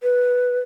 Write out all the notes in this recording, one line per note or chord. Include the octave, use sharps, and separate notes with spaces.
B4